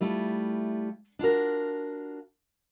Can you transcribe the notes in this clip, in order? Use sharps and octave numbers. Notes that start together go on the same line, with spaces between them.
G3 A3 E4 F4
D4 F4 F#4 A#4